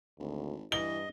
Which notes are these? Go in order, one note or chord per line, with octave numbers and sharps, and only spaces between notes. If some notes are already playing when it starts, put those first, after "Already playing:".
G#1 D2
G2 E3 D#5 G7